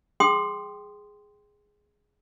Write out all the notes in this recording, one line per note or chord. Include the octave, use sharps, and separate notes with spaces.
G#4 G5 C6 D#6